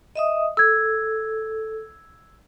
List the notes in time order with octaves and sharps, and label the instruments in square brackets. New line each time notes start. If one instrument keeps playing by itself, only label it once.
[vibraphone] D#5 E5 D#6
[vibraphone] A4 [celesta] E6 G#6